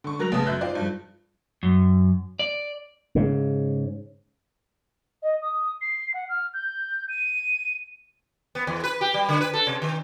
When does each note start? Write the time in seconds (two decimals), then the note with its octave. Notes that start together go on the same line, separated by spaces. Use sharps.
0.04 D3 C#6
0.19 F#3 A#4 F#6 A#6 F7
0.32 A1 C#3 B3 A5 D#6
0.46 F#2 E5 F#6 G6
0.61 D#4 F4 C5 D5
0.75 G2 F3
1.63 F#2
2.39 D5
3.15 G#2 C#3
5.22 D#5
5.42 D#6
5.81 C7
6.14 F#5
6.29 F6
6.53 G6
7.09 D#7
8.55 B3
8.67 E2
8.84 B4
9.01 G4
9.14 G3
9.29 D3
9.41 B4
9.54 A4
9.67 C3
9.82 D#3